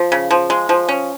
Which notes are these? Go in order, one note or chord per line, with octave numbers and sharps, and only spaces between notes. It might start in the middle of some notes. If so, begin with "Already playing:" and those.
Already playing: F3
C#3
F3
G#3
F3
C#4